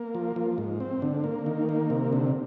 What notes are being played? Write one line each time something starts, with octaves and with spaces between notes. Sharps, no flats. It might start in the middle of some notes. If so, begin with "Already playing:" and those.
Already playing: A#3
F3
F3
G#2
C4
D3
A#3
D#3
A#3
C3
D3